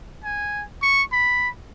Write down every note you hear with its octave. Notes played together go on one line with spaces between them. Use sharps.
G#5
C#6
B5